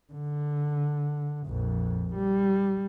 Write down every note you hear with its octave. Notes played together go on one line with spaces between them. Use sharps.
D3
A#1 F2
G3